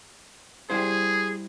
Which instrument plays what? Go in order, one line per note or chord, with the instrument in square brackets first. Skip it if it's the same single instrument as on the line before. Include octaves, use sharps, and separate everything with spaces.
[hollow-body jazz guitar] G3 E4 C5 [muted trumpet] G#4